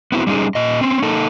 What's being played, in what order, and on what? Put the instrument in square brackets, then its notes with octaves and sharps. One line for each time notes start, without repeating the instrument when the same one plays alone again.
[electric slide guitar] B3 C4 E4 F#4 C5
G3 C#4 D#4 G#4
A#2 D#5
C4 C#4
A#3 D#4 A4